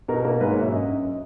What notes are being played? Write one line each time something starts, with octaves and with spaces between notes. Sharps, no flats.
B2 A#4
A#3
G#2 B4
C#5
F#3 E5
F#2 D#5
F#2